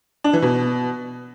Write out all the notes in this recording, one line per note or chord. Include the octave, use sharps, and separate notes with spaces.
D4
E3
B2